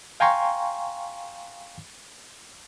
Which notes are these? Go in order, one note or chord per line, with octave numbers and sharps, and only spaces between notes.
F5 G5 G#5 A#5 C6 C#6